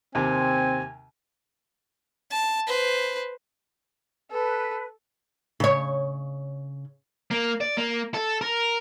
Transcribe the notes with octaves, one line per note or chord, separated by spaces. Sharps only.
D#2 C3 C4 G#5
A5
B4 C5
A4 B4
C#3 C#5
A#3
D5
A#3
A4
A#4